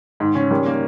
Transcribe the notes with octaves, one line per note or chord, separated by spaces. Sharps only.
G#2 D#3
C#3 C#4
D#3 G3
A#3